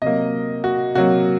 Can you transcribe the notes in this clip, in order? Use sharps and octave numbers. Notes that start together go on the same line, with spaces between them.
C3 F#3 A#3 D#5
F#4
C3 F#3 A#3 F#4